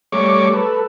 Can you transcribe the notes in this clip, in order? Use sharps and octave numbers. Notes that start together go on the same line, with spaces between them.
G3 A3 C#5 C#6 D6
A4 B4